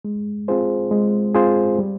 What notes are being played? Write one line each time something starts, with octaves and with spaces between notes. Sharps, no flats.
G#3
C4 F4 G#4 C5
G#3
C4 F4 G#4 C5
G3